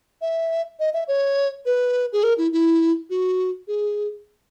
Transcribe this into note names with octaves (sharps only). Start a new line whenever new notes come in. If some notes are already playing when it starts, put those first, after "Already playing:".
E5
D#5
E5
C#5
B4
G#4
A#4
E4
E4
F#4
G#4